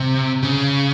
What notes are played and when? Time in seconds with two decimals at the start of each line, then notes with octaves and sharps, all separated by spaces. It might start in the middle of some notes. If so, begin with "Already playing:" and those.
Already playing: C3
0.43 C#3